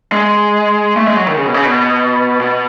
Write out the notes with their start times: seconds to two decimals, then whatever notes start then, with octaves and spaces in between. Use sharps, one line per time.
0.12 G#3
0.97 A3
1.08 G#3
1.16 F#3
1.27 D#3
1.36 C#3
1.46 B2
1.54 C#3
1.65 B2
2.40 B2